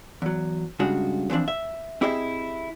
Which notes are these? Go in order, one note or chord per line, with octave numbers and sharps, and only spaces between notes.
E2 F#3
G2 C#3 G#3 D4 F#4
D3 E3 F3 C4 D4
E5
C4 E4 G4 G#4 D#5 E5